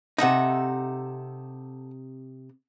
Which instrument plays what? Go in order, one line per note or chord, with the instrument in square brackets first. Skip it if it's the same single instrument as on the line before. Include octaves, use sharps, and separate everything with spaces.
[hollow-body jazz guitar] C3 D#4 [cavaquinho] A4 E5 F#5